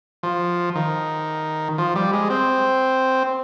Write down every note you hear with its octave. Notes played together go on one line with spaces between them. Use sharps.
F3
D#3
F3
G3
G#3
C4